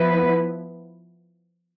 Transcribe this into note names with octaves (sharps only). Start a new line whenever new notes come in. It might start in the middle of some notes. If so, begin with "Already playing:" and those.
Already playing: F3 B3 E4 B4